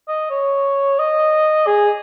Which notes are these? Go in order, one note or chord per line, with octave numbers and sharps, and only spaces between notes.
D#5
C#5
D#5
G#4